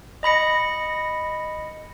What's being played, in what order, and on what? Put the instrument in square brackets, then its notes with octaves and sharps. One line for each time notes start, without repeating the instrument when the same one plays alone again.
[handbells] D#5 B5 A#6 C#7